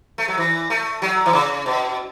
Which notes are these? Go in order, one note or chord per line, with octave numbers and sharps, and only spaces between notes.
A3
F#3
E3
A3
F#3
E3
C#3
B2